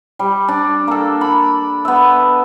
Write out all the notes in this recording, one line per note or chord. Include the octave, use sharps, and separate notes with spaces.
G3
D4
A#3 A4
A4 B5
B3 E5